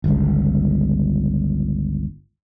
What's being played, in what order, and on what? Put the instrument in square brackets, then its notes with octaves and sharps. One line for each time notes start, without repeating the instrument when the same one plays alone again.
[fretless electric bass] G1 C#2